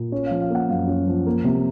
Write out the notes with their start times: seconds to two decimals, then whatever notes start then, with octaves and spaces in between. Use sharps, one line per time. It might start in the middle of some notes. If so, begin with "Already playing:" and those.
Already playing: A#2
0.12 C#4 C#5
0.26 F3 F5
0.41 F5
0.50 A#3 F#5
0.69 F#2 F5
0.88 C#4
1.07 F3
1.26 A#3
1.44 C3